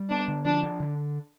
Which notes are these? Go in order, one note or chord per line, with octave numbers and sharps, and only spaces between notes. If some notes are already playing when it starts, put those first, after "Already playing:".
Already playing: G3
B3 D4
D3
F3 D4
D4
D3